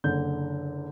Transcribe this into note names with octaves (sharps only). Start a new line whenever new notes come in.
F#1 D3 G6